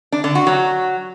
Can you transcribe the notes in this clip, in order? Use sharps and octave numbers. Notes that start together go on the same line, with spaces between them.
D4
D3
F#4
F#3